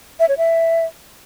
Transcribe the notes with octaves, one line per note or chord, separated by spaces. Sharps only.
E5
C#5
E5